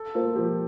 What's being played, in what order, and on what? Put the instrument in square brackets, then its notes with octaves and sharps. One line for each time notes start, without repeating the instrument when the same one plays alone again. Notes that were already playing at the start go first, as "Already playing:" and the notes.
Already playing: [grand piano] A4
[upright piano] A#3 F4 C5
[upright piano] F3 [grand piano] G4